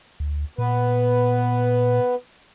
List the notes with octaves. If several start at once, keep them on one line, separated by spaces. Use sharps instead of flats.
D2
A#2 B3 B4